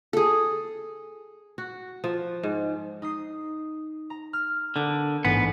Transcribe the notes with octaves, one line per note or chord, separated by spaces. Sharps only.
G#4 A4
F#4
F3
G#2
D#4 D#6 C7
A#5
F6
D3 B3 D4 A#4
A1 G#2 B3